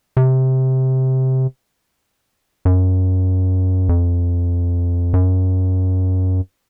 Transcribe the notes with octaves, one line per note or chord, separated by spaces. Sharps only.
C3
F#2
F2
F#2